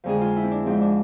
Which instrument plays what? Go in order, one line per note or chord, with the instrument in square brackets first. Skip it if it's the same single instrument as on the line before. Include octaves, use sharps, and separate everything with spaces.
[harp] F2 D3 F3 G#3 G#4
F4
E4
C4
D4
G#2 F3 G#3 C4
D4